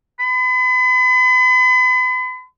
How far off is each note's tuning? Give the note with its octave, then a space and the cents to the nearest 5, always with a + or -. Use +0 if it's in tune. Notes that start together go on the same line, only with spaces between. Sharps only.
B5 +40